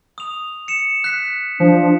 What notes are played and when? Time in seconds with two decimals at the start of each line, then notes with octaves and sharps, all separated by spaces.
0.18 D#6 F7
0.68 C#7 E7
1.04 F#6 B6
1.60 F3 D4